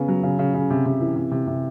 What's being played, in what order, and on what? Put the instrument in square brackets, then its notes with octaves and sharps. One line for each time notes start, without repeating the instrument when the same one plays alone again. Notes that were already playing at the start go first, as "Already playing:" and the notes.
Already playing: [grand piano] C#3 B3
F#3
C#3
C#3
C#3
C3
C3
E3
C3
C3
C3